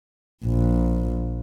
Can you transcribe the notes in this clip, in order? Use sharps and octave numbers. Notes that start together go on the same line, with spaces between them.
A#1